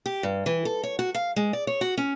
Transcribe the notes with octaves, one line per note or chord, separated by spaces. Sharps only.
G4
G2
E3
A4
C#5
F#4
F5
G#3
D5
C#5
F#4
C#4